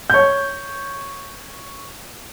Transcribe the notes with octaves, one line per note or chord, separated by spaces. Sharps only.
C#5 G6